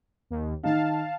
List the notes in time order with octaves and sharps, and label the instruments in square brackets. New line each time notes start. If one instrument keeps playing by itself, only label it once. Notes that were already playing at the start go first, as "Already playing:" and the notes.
[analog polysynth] D#2
[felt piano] D#3 D#4 [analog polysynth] F5 A5